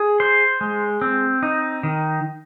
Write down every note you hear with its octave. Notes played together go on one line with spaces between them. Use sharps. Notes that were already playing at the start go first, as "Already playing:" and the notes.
Already playing: G#4
C5
G#3
C4
D#4
D#3